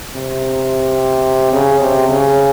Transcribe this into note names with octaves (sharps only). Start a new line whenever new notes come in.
C3
C#3
C3
C#3